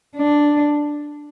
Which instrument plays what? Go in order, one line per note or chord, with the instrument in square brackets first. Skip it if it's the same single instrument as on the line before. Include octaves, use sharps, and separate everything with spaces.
[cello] D4